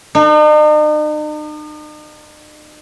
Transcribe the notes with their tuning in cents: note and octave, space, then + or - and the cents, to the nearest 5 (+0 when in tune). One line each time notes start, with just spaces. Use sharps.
D#4 -45